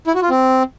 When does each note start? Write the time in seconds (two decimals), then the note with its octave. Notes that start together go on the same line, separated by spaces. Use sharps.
0.07 E4
0.15 F#4
0.22 F4
0.30 C4